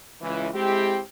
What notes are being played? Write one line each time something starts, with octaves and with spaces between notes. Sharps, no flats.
C#2 E3
G#3 C4 E4 G4